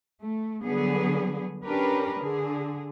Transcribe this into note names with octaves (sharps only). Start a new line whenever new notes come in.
A3
D3 F#3 G3 B3 G#4
C#4 D4 G4 A#4 B4
D3 G#4